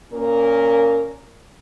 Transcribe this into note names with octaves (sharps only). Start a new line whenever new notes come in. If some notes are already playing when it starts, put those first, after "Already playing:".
A#2 A#3 C#4 A#4